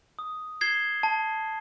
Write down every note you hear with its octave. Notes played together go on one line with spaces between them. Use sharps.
D#6
G#6 C7 E7 G7
A5